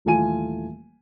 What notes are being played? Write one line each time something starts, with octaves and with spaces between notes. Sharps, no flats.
D#1 E3 A3 F4 G#5 D#7